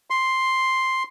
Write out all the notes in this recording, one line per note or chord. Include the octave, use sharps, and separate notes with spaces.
C6